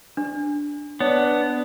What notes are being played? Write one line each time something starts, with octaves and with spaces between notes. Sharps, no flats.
D4
B3 D4 C#5